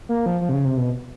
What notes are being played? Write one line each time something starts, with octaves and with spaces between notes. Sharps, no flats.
A#3
F3
F3
C3
C#3
C3
B2